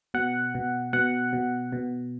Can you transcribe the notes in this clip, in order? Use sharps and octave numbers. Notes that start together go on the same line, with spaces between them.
B2 F#5
B2
B2 F#5
B2
B2